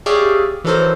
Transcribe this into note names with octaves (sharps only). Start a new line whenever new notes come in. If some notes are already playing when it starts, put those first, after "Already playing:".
G4 G#4 C#5 D5 E5 F5
E3 F#3 D#4 A4 A#4 C5